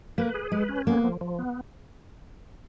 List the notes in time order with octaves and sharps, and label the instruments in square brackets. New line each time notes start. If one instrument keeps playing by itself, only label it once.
[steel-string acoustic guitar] A#3 [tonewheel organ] B4
[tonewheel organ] G#4
[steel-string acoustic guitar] G#3 [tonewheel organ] B4
[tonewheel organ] C#4
[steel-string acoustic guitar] A#3 [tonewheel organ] B3
[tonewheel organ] F3
F3
B3